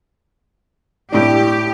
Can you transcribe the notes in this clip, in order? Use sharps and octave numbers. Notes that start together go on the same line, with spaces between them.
A2 D4 G4